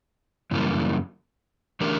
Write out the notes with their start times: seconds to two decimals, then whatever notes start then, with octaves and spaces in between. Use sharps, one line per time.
0.51 F#2 C#3 E3 G3 A#3
1.81 E3 A3 D4 G4 A#4